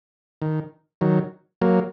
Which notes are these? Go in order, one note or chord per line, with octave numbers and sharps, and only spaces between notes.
D#3
D#3 F#3
F#3 A#3